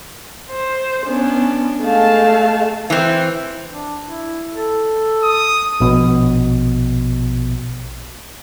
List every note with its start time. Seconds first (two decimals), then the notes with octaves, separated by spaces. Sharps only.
0.51 C5
1.06 B3 C#4 D4
1.83 G#3 A3 F5 A5
2.90 E3 C4
3.68 D4
4.05 E4
4.52 A4
5.23 D#6
5.80 A#1 B2